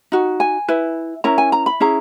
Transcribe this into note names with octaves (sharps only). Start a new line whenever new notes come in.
D#4 F#4
G#5
E4 B4
C#4 E4 A#4 A#5
G#5
A#5
B5
C#4 E4 G#4 A#5